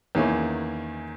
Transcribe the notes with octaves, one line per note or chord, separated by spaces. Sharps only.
E2 D#3 A#3 C#4 E4